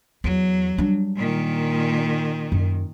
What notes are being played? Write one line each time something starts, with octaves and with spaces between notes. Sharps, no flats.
E2 F#3
G3 D4
A#2 D#3
F#2